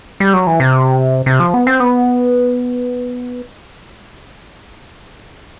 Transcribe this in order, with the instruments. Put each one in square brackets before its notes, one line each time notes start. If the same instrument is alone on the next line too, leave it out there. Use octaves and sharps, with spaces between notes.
[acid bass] G3
F#3
E3
C3
C3
F3
B3
C4
B3